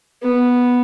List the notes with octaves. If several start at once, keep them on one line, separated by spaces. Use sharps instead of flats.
B3